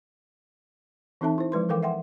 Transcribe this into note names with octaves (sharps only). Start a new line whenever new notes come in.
E3 C4 D#4 A4 E5 A5
E4 C5
F3 G#3 B4 C6
E3 A4 A#4 F5 G5 D6
E5 F#5 G5 C6